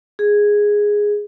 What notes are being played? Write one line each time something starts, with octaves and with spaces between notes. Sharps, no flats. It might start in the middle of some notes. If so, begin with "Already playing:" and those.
G#4